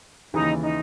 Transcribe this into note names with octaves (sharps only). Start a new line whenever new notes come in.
D#2 C#3 E3 D#4
D#4